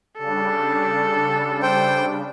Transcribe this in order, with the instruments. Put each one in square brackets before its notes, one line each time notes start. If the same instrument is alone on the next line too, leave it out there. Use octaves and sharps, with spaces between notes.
[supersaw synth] C#3 G3 D4 [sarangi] A4
[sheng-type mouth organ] C5 G5